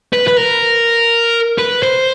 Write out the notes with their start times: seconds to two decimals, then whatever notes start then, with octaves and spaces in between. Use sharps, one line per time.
0.13 B4
0.28 B4
0.37 A#4
1.59 B4
1.83 C5